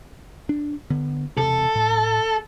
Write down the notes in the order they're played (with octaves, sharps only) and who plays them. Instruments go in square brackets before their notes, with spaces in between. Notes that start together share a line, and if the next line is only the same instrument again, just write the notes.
[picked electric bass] D4
D3 B3
[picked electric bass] E1 C3 [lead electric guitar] A4
[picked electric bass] A2